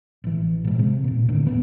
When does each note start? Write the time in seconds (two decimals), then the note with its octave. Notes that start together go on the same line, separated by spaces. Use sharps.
0.24 A1 E3
0.64 A#2 G#3
0.79 C3
1.04 D#2 A#2
1.28 A2 D3 D#3
1.47 D#1 F#2 B3